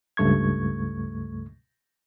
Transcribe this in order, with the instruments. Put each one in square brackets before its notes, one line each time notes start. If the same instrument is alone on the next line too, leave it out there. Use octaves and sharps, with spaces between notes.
[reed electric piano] C#2 G2 A3 C#6 G#6